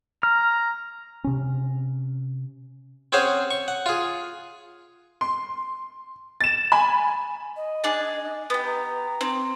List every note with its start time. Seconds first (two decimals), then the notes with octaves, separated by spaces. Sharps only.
0.23 A#5 F6
1.24 C3 C#4
3.12 C4 C#4 G#4 C5 C#5 F#5
3.51 C#6
3.68 F#5
3.86 F4 G#4
5.21 C6
6.41 A6 E7
6.72 G#5 B5
7.57 D#5
7.84 D4 G#4 A5
8.50 B3 G4
8.66 A#5
9.21 C4